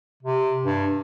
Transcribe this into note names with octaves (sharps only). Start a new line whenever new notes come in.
C3
G2